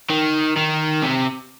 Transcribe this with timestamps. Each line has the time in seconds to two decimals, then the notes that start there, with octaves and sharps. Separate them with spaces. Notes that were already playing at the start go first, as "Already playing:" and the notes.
0.10 D#3
0.57 D#3
1.02 C3